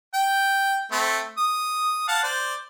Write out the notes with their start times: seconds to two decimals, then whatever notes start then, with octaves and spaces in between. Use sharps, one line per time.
0.14 G5
0.92 A3 C4
1.38 D#6
2.08 F5 F#5 A5
2.23 C5 D5